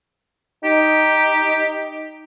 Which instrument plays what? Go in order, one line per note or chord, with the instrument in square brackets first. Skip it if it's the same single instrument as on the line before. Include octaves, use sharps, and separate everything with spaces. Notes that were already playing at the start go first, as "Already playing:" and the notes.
[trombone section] D#4 [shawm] G4